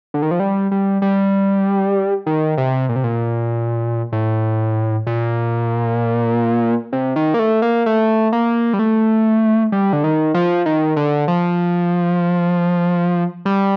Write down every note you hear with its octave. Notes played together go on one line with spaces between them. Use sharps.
D3
D#3
F3
G3
G3
G3
D#3
C3
A#2
C3
A#2
A2
A#2
C3
D#3
A#3
A3
A#3
A3
A#3
G3
A3
G3
D3
D#3
F3
D#3
D3
F3
G3